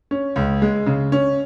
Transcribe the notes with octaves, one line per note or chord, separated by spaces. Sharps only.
C#4
C#2
G#3
C#3
C#4